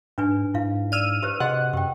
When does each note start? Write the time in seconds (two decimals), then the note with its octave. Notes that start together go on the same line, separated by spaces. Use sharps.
0.18 G#2 D4 B4 G#5
0.54 G#2 E4 F5
0.92 D5 E6 F6 D#7
1.23 G4 B4 C5
1.40 C3 F#4 G#4 D#5 F#5
1.73 F#2 G4 G5